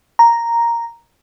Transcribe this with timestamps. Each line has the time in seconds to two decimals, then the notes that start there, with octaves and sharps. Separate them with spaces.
0.19 A#5